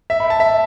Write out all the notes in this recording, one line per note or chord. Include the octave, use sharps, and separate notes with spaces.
E5
B5
A5
E5